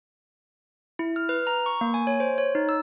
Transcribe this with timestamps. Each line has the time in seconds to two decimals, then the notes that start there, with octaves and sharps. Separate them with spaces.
0.99 E4
1.16 F6
1.29 B4
1.47 A#5
1.66 C#6
1.81 A#3
1.94 G#5
2.07 C#5
2.20 C5
2.38 C#5
2.55 D#4
2.69 E6